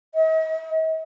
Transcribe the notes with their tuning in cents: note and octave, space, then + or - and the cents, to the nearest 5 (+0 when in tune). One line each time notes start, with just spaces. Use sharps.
D#5 +45